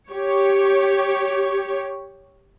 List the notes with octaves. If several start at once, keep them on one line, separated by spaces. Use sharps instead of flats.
G4 C#5